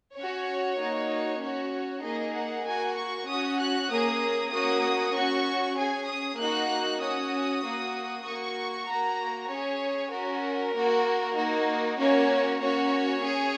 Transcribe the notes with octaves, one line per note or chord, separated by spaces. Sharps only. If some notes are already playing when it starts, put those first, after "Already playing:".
C#4 F#4 C#5
A#3 D#4 F#4
C#4 F#4 C#5
A#3 D#4 G#4 D#5
F#5
A#3 F#4 G#5
C#6
C#4 F#4 D#6
F#6
A#3 C#4 G#4 D#6
A#3 C#4 F#4 D#6
C#4 F#4 C#6
C#4 G#4 G#5
D#6
A#3 D#4 F#4 F#6
C#4 F#4 D#6
A#3 F#4
A#3 F#4 C#6
A#3 F#4 A#5
C#4 G#4 C#5
C#4 F#4 A#4
A#3 F#4
A#3 D#4 F#4
A#3 C#4 F#4 C#5
A#3 C#4 F#4 C#5
C#4 G#4